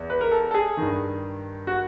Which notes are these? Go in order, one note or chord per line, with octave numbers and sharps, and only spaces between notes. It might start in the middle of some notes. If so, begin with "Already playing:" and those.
Already playing: E2
B4
A#4
A4
A4
G#4
G2 D#3
F#4